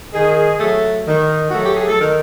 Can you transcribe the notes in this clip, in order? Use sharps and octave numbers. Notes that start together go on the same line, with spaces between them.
D#3 G#4
F#3 A3
D#3
F#4
F#3 A3
G4
G#4
A4
D#3 A#4